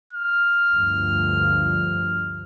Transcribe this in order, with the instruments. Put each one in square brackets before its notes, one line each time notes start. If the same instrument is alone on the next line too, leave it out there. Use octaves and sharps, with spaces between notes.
[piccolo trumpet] F6
[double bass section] D2 G2 F3